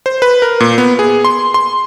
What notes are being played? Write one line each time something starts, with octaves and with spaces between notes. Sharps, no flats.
C5
B4
A#4
A#2
B3
G#4
C6
C6